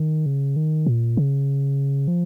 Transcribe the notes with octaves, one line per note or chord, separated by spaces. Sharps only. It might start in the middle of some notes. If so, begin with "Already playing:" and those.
Already playing: D#3
C#3
D#3
A#2
C#3
F3